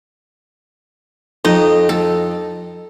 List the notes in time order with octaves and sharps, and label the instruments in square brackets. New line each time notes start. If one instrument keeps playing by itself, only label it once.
[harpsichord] F2 [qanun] D#4
[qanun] A4